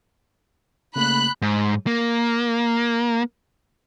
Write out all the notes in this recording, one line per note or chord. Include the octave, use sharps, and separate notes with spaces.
C#3 A3 A#3 B5 F#6
G#2
A#3